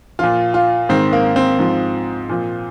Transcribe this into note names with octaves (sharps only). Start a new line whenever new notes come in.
A#2 F3 F4
F4
G#2 D#3 C4
A#3
C4
G#2 F3
A#2 F3